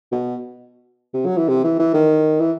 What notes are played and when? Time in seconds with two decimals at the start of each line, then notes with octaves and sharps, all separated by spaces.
0.12 B2
1.14 C3
1.25 F#3
1.37 E3
1.48 C3
1.64 E3
1.79 E3
1.94 D#3
2.40 E3